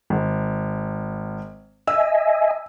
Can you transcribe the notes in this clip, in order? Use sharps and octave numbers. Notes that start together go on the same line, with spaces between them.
G#1
D#5 E5 G#5 E6